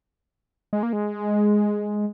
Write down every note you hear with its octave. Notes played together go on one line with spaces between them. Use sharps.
G#3
A#3
G#3